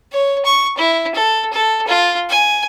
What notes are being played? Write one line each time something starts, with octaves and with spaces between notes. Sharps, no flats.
C#5
C#6
E4
A4
A4
F4
G#5